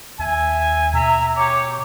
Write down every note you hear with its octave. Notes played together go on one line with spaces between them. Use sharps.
D#2 E5 G#5
B2 E5 A#5
G4 C#5 D6